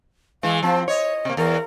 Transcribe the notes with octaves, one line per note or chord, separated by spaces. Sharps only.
E3 G#3 F5
F3 C4 A5
C#5 D#5
C3 A#3
E2 A#4